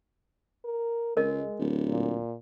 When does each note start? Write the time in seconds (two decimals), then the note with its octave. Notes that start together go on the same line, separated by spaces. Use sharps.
0.65 A#4
1.17 C#2 G#3 A#4 D#5
1.59 D1
1.89 A#2